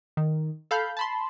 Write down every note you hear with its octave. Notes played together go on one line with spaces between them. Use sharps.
D#3
A4 F5 B5 G6
A5 B5 C6